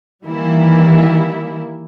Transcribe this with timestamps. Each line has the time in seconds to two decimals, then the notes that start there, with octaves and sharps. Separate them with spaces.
0.27 D#3 E3 G3 A#3 E4